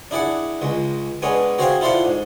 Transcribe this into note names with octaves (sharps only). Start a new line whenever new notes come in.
D4 E4 G#4 D5 F#5
C#2 G#3
G#3 B3 C#4 D4 G#4
F#4 G#4 C5 F5 G5 G#5
E4 F4 A4 C5 D5 F#5
G#2